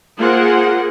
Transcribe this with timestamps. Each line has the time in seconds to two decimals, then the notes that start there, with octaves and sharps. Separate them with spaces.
0.18 A#3 F4 G#4 A#4 C5 F#5